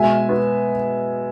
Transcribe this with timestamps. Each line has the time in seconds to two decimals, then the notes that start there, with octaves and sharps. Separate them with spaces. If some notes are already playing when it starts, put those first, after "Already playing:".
Already playing: B2 G#3 E5 G#5
0.29 B3